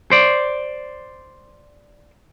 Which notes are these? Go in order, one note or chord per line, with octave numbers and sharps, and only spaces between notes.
C5 D5